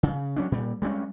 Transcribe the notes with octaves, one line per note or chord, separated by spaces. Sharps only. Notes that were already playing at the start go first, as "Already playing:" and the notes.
C#3
F#3 C#4 D4
A#2 G3
G3 G#3 B3 C#4